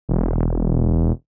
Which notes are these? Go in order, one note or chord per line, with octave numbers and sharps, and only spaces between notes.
E1